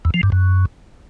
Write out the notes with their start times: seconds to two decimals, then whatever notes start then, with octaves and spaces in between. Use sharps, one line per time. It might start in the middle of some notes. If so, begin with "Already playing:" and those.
0.05 E2
0.14 F3
0.23 G2
0.32 F#2